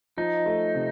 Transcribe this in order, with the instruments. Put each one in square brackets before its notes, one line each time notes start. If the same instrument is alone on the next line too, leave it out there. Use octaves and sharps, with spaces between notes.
[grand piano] F3 [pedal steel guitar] D#4
[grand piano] A3
C3